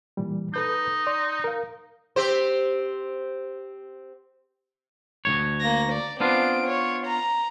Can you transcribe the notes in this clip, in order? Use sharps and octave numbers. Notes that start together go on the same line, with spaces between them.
A#2 E3 G3
D#4 A4 B4 G6
D5 C6
A#4 F5
C4 G4 C5
D2 G#2 C#5
A#3 A#6
D5
B3 C4 D4 F4 D7
C#5
A#5